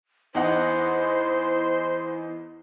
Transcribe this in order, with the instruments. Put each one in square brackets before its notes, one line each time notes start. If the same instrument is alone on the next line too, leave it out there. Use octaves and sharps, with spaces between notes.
[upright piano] E2 D#4 F#5 [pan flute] E4 [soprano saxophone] C5